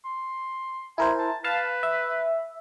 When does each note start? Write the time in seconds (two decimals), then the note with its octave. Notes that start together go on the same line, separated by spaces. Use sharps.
0.05 C6
0.98 E4 A#4 C5 G#5
1.18 A5
1.44 B4 F5 A5
1.83 E5